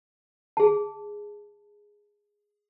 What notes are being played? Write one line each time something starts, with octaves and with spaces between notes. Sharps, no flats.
G#4 A5